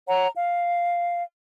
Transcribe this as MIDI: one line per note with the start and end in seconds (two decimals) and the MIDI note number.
0.07 0.27 73
0.07 0.27 78
0.07 0.27 82
0.35 1.21 77